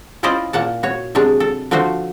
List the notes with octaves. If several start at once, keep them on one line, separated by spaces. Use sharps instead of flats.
C#4 E4 F4 C5 D5 D#5
A#2 A#3 F#5 A5
F#4 C#5
C3 F#3 G#3 D4
A4
D3 F3 A3 F#4 C5